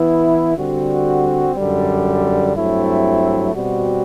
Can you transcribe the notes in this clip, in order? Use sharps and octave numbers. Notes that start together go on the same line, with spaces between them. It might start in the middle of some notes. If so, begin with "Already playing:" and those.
Already playing: E3 B3 E4
D3 G3 C4 F#4
F#2 D3 G3
G2 F#3 A3 C4 E4
B2 G3 C4 F#4